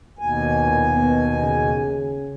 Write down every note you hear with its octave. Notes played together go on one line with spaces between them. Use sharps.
D#2 B2 G#5
A#2
B3
C#3